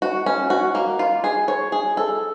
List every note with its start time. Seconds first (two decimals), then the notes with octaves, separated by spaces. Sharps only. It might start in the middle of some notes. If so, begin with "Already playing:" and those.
0.02 F#4
0.26 C#4
0.50 F#4
0.75 A#3
0.99 F4
1.24 G#4
1.48 C#5
1.72 G#4
1.97 A4